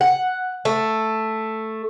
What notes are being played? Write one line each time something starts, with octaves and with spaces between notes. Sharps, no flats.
F#5
A3